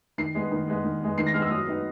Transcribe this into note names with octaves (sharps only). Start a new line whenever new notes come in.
D#3 C7
G#3 B3
D#3
G#3 B3
D#3
G#3 B3
D#3 C7
A#6
G#3 B3 F6
E6
F#3 D#6
B3 D#4